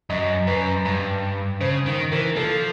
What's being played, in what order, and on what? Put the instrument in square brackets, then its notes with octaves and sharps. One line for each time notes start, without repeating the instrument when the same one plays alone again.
[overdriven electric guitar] F#2 [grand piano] D#5
[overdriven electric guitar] F#2 [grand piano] B4
[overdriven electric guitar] G2
[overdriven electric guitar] C#3 [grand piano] C5
[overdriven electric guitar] D#3
[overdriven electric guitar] E3 [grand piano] A#4
[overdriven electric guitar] F3 [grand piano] A4